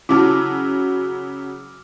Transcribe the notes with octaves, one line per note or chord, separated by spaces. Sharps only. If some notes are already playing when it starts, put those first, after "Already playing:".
C#3 F#3 E4 A5 D6 E6 F6